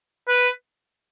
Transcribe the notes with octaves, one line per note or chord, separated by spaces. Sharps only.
B4